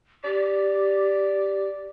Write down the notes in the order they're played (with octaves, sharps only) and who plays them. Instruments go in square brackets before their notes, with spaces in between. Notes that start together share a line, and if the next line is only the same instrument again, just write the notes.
[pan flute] G4 [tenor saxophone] D5